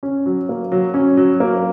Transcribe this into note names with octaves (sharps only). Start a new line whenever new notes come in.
C#4
F#3
A#3
F#3
C#4
F#3
A#3